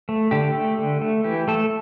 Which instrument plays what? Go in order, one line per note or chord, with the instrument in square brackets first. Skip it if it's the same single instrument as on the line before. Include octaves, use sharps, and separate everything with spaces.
[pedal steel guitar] A3
D3 G4
A3
D3
A3
E3 G4
A3 A4